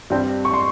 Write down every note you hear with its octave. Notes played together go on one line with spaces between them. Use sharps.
G2 G3 C4
C#6
C6